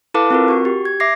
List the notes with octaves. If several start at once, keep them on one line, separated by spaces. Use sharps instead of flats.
E4 A4 B4 F5 A5 D6
C4 F4 A#4
F#4 C#6
G4
G#6
E5 D6 A#6 C7